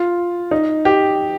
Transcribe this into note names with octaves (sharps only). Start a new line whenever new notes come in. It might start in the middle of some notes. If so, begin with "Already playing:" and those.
Already playing: F4
D#4
G4